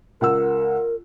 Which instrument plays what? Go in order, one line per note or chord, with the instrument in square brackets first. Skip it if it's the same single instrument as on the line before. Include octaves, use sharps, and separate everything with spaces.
[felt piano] C#2 F#5 E6 [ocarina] A#4